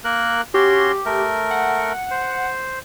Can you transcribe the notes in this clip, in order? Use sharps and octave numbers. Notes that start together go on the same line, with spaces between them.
A#3 A#4 F#6
C#4 F#4 G4 C6
A3 A#4
F#5
C5